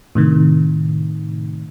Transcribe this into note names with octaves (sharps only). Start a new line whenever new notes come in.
A2 C3 D#3